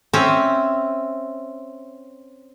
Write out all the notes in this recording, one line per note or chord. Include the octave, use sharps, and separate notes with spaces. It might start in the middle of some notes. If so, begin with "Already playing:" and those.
C4 C#4 E5